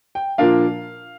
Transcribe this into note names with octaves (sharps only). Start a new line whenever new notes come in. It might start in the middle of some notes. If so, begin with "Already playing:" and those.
G5
A#2 F3 A#3 D4 F5